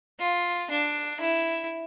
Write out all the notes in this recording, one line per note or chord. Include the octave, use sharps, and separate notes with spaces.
F4
D4
E4